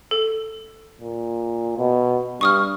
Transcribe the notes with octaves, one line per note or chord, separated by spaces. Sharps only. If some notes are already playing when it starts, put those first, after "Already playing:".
A4
A#2
B2
G2 C#6 D#6 F6